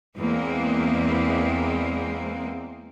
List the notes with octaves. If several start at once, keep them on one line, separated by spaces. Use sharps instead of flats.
E2 G#3 A#3 C4